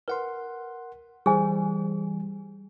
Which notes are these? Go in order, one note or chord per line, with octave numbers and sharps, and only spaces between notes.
A#4 B4 F#5 C6
E3 G3 G#4 C5 G#5